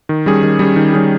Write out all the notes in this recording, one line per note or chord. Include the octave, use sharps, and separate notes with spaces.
D#3
G3 C#4 G#4
D#3
G3 C#4 G#4
D#3
G3 C#4 G#4